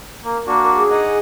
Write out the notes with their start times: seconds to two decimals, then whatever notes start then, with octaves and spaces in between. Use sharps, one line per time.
0.24 A#3 A#4
0.47 A#3 D4 F#4
0.73 G#4
0.91 D#4 D#5 F#5